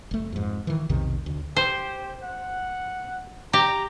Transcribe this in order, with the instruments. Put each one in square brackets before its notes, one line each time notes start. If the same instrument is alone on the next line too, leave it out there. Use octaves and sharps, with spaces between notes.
[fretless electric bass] F#1 A3
F2 G#2
D#3 E3
B1 F2 C3 D#3
D2
[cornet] G4 [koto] C5
[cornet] F#5
[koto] G4 [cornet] A#5